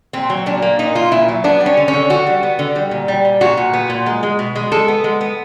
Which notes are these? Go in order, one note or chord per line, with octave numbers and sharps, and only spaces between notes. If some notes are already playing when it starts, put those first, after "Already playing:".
A#2 C4
F#3
A#2 D4
A#3
A#2 D#4
A#3 F4
A#2 E4
F#3
B3 D4
G3
C#4
D3
C#4
D3
D3 F#4
G3
B3
D3
G3
A#2
G3
A#2
A#2 F#4
A#2
B3
A#2
G#3
G#3
B2
G#3
G#3 A4
B3
G#3
B3